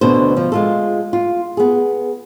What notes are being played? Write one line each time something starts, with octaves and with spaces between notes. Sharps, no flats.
D2 B2 D3 D4 C5
F3
G#3 F4 A4
F4
B3 G#4